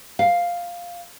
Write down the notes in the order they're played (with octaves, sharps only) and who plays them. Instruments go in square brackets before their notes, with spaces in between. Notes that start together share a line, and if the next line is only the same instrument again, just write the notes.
[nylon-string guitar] F5